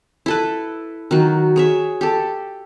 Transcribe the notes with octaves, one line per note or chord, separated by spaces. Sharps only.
E4 A4 B4
D#3 F#3 F#4
G#4 C#5 E5
G4 A4